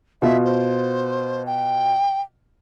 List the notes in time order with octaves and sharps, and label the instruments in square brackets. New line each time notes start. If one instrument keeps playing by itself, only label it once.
[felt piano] B2 F4 [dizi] E5
[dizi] C5
G5